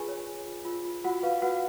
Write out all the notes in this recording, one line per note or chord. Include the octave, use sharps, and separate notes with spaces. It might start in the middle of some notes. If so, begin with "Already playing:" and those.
Already playing: F4 G#4 B4 G#5
C#5
F4
F4
F4
F4
F4 F#4 F#5
B4 F5
F#4 B4 F#5